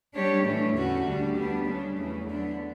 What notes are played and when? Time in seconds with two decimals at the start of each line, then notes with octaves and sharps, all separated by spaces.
0.13 G3 D4 G4 C#5
0.44 A2 E3 A3 D4
0.74 E2 D3 A3 C#4 F#4
1.05 D2 D3 G3 D4
1.35 G3 B3 D4
1.66 C#3 G3 D4
1.96 E2 C#3 E3 A3
2.27 D3 F#3 B3 D4